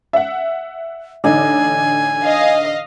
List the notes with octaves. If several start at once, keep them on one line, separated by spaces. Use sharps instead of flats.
E5 F#5
A1 D3 D#4 G#5
D#5 F5